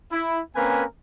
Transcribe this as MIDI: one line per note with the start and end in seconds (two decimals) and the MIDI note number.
0.11 0.40 64
0.55 0.83 58
0.55 0.83 60
0.55 0.83 61
0.55 0.83 70
0.55 0.83 71
0.55 0.83 80